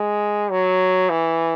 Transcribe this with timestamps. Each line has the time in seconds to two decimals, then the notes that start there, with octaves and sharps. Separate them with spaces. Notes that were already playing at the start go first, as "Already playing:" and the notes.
Already playing: G#3
0.51 F#3
1.10 E3